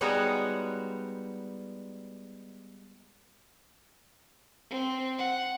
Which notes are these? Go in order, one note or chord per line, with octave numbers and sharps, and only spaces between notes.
G3 G#3 B3 D#4 F#4 C#5
C4
F#5